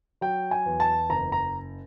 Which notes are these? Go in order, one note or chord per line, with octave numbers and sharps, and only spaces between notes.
F#3 G5
G#5
E2
A5
F#1 A#5
A#5